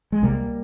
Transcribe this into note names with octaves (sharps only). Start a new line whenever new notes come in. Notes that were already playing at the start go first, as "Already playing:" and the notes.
G#3
C2 C3 G3 A#3